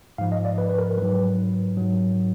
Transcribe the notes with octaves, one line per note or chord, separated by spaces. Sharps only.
G#2 F3 F5
D#5
D5
B4
B4
A#4
G#2 F#3 B4
G#2 F#3